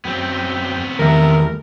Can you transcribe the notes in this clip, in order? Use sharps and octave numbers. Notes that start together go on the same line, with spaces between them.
F#2 B3 C4 G5
E2 D#3 G3 A3 A#4 E5